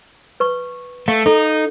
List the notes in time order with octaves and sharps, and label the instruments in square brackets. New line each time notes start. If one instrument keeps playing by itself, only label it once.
[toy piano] B4 C#6
[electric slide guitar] A3 [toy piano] F5
[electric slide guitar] D#4 [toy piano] A4